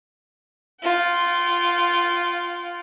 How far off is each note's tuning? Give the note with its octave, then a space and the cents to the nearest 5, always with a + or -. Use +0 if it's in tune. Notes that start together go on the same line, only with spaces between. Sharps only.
F4 +0 G5 -45